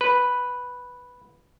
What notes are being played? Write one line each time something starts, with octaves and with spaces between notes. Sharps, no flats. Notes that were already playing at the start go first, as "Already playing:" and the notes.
B4